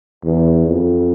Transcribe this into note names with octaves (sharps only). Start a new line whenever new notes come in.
E2
F2